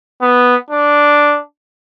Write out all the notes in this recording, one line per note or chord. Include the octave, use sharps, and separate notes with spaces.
B3
D4